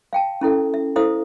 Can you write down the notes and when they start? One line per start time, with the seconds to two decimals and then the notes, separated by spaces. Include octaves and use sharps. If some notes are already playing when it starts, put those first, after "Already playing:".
0.13 F5 G5 A5
0.41 C#4 E4 A4 E5
0.74 E5
0.96 E4 A4 C5 E5 F5 D#6